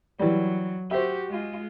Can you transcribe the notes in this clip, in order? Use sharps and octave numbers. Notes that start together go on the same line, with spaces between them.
E3 F#3 G3
F#4 G4 C5 E5
G#3 F4